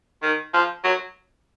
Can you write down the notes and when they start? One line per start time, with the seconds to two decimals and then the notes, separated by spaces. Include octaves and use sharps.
0.22 D#3
0.54 F3
0.84 F#3